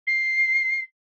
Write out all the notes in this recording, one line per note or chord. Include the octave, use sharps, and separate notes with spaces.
C7